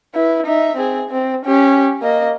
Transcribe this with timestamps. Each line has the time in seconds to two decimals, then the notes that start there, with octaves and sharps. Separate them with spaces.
0.15 E4 B4
0.46 D#4 E5
0.76 C4 G#4
1.10 C4
1.45 C#4 G4
2.02 A#3 D#5